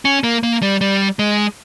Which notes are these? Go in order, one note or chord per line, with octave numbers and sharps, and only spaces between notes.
C#4
A#3
A#3
G3
G3
G#3